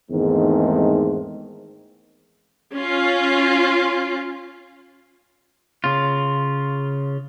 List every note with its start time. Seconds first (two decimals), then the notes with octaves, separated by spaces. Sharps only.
0.10 E2 G#2 D#3 G#3 A3 C4
2.74 C#4 F4
5.84 C#3 F4